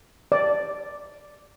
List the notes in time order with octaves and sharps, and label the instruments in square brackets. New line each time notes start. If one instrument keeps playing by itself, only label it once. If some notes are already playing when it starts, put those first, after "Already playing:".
[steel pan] D5